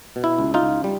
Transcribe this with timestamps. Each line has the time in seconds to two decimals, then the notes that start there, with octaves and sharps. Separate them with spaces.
0.16 B2
0.24 E4
0.39 C#2
0.54 D#4 F4
0.62 C#2
0.84 G3